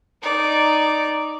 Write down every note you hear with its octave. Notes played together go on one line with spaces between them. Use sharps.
D#4 D5